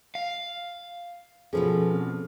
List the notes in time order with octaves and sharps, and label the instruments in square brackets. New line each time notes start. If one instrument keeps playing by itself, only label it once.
[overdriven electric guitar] F5
[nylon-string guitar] B2 F3 C#4 [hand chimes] G#4 A4 B4
[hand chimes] C4